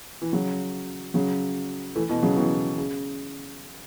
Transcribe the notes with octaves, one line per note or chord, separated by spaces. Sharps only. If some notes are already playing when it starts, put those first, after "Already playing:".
E3
C#3 F#3
C#3 F#3
E3 A3
B2 E3
C#3 F#3
B2 E3
C#3